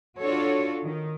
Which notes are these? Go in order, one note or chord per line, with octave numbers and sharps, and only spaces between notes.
D4 F4 F#4 A4 C#5
D#3